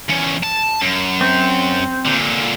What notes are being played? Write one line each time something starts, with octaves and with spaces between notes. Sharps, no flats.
E2 C#4
A5
F#2
C4
A#2 D3